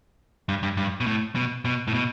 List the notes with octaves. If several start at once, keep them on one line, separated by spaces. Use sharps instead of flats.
G2
G2
G2
B2
A2
B2
B2
A2
B2